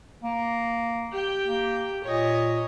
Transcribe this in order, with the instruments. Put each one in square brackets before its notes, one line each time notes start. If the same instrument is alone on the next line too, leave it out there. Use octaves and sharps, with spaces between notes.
[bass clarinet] A#3
[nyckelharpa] G4 G5
[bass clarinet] A#3
[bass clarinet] A#2 [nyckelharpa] C#5 D#5